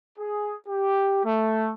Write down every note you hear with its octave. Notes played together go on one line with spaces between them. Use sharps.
G#4
G4
A3